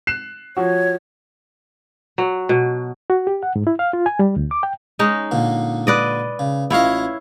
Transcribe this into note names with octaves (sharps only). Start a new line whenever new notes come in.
F#6 C7 E7
F3 F#4 C#5
F#3
B2
F#4
G4
F#5
G#2
E4
F5
F4
G#5
G3
D2
D6
G5
G#3 C#4 D#4
A#2 D3
B4 D5 D#5
C#3
A1 E4 F4 C#5 D#5 F5